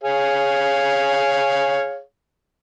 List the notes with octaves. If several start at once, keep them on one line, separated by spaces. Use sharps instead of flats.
G#4 C#5 F5